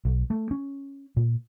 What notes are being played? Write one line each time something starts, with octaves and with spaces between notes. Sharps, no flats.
B1
A3
C#4
A#2